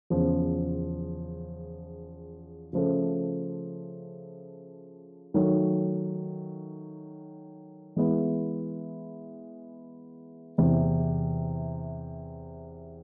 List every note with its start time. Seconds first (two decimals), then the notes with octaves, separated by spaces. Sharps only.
0.10 E2 C#3 F3
2.73 C#3 F3 A3
5.34 D#3 F#3 A3
7.96 E3 G#3 B3 E4
10.58 E2 C3 E3